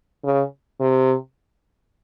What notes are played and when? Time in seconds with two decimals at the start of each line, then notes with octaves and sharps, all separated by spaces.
0.24 C#3
0.80 C3